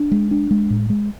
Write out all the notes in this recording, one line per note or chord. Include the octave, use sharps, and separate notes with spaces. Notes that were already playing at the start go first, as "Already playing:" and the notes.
Already playing: D4
G#3
D4
G#3
A2
G#3